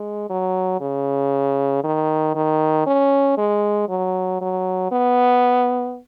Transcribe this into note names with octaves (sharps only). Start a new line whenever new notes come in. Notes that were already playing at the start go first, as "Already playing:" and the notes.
Already playing: G#3
F#3
C#3
D#3
D#3
C#4
G#3
F#3
F#3
B3